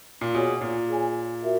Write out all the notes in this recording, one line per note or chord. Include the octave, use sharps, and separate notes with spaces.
A#2
B2 G#4 C#5 G#5
A#2
G#4 C#5 G#5
F#4 A#4 E5